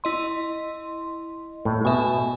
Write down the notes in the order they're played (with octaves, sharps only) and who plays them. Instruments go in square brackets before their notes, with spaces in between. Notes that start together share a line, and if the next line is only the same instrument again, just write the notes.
[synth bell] E4 D#5 C6
[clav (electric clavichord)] A2
[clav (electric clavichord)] B2 [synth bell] E5 G#5